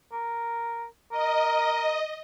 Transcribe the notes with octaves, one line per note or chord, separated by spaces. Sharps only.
A#4
A#4 D#5